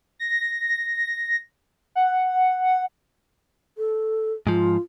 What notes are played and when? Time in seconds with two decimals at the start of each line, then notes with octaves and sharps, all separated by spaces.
0.19 A#6
1.95 F#5
3.78 A4
4.47 G#2 F3 F4